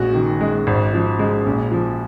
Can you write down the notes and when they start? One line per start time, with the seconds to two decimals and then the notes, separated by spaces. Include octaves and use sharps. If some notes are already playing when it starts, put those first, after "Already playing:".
Already playing: A#1 G#3 F#4
0.15 D#3
0.41 G#3
0.67 G#1
0.93 F3
1.19 G#3
1.46 A#1
1.71 F3